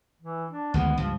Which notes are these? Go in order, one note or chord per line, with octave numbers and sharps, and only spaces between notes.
E3
D4
D2 D#3 G#3 B3
C#2 G2 F3